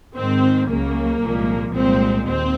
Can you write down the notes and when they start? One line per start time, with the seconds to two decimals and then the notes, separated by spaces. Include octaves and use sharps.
0.15 G#2 D#3 G#3 C4
0.68 C#2 C#3 F#3 A#3
1.22 C2 A#2 F3 G#3
1.74 C2 A#2 G#3 C4
2.27 D#2 C4